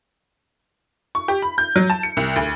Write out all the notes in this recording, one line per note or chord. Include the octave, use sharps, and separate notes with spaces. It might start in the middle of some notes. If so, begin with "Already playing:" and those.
C#6
G4
B5
G6
F#3
A5
C#7
C2
D2